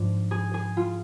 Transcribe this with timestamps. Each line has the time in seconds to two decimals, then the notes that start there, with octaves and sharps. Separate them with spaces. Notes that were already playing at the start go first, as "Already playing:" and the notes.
Already playing: G#2 F3 D4 F4
0.31 G#4
0.54 G#4
0.77 F4